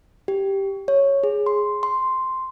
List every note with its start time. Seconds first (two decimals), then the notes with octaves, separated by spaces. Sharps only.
0.28 G4
0.88 C#5
1.23 G#4
1.46 C6
1.83 C6